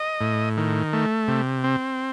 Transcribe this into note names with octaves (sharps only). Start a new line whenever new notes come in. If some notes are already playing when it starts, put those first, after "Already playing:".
Already playing: D#5
A2
D#3
A3
C3
C4